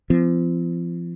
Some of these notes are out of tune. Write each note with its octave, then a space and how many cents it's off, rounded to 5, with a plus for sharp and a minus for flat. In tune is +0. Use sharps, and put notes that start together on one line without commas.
F3 -35 C4 -30